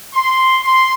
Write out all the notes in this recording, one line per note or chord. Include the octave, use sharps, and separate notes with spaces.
C6
C6